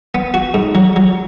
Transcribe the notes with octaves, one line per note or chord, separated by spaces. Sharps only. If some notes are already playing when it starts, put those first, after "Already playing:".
B3
F#4
G#2
F#3
F#3